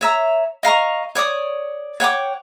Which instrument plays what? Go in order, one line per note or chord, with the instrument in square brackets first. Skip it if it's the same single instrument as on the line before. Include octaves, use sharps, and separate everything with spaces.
[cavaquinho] C#5 E5 A#5
D#5 F5 A#5 C#6
C#5 D5 D6 D#6
C#5 F#5 G5 D6